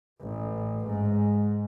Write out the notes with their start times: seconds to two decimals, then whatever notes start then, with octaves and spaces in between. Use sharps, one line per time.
0.21 A1
0.87 G#2